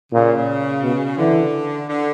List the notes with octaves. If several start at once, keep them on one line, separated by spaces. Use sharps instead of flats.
A#2 C#3
B2
D3 E3
D3